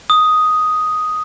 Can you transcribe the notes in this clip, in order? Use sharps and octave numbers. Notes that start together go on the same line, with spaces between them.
D#6